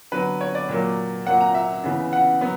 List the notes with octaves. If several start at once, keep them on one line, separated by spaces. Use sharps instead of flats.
D3 F#3 B3 B4
C#5
D5
A#2 F#3 A#3
A#2 F#3 A#3 F#5
A#5
E5
C#3 E3 B3
F#5
F#3 B3